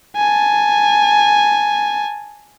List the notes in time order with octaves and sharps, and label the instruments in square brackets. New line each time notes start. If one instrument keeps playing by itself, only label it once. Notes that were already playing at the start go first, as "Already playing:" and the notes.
[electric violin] G#5 A5